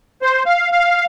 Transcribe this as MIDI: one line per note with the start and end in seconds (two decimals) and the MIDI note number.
0.22 0.43 72
0.46 0.70 77
0.72 1.05 77